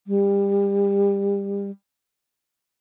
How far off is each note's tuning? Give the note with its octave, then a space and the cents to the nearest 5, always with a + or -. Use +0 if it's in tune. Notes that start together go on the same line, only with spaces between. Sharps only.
G3 +30